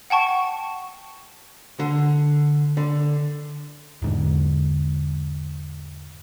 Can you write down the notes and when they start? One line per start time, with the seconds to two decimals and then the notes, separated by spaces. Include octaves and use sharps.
0.10 F#5 G5 A5 C#6
1.79 D3
2.77 D3
4.02 E2 G#2 D3